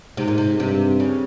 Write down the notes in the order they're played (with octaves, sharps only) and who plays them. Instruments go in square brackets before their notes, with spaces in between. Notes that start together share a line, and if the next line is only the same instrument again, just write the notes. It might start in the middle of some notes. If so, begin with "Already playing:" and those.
[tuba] G#2 [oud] C3
[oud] A#2
C3
[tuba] G2 [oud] C3
[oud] C#3